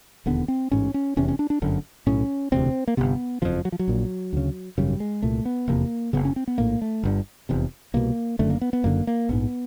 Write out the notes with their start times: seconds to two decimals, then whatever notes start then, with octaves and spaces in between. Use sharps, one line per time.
0.26 E1 D#2 D3 B3
0.48 C4
0.71 A1 G#2 C#4
0.94 C#4
1.16 F1 E2 C3 C#4
1.28 C#4
1.39 D4
1.50 D4
1.62 G1 F#2 D3
2.07 B1 A2 C#4
2.52 E1 D2 C3 C4
2.88 A#3
2.97 G1 F2 C3 B3
3.42 C3 F3
3.45 F#1 F2
3.65 F#3
3.72 F3
3.79 F#3
3.88 A#1 A#2
4.33 D2 C#3
4.78 G#1 F#2 C#3 G3
5.00 G#3
5.22 C2 A#2 A3
5.45 B3
5.68 F1 E2 C3 A#3
6.13 F#1 F#2 C#3 B3
6.25 C#4
6.36 C4
6.48 B3
6.58 A#1 A2 A#3
6.82 A3
7.03 G1 G2 D3
7.49 F1 E2 C3
7.94 C2 B2 A#3
8.39 F#1 F#2 D3 A3
8.50 A#3
8.61 B3
8.73 B3
8.84 F#1 F#2 D3 A#3
9.07 A#3
9.29 A#1 G#2 B3